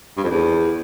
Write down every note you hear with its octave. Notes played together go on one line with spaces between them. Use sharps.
G2
F2
E2